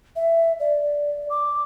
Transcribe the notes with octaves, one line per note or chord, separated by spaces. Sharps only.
E5
D5
D6